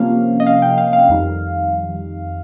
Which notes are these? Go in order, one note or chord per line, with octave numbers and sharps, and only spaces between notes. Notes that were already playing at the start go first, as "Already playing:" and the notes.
Already playing: C3 F3 A#3 C#4 F5
D#5
F5
G5
F5
F5
F2 D#3 G3